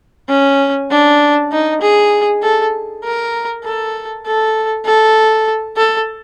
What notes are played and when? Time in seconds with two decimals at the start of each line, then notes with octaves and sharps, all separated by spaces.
0.29 C#4
0.91 D4
1.52 D#4
1.81 G#4
2.42 A4
3.04 A#4
3.64 A4
4.26 A4
4.85 A4
5.77 A4